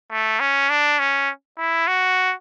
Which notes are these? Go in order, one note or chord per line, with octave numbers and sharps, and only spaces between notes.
A3
C#4
D4
C#4
E4
F#4